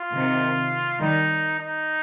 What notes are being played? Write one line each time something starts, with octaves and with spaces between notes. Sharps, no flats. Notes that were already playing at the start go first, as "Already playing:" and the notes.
Already playing: F4
C3 D#3
D#3 G3 D#4
D#4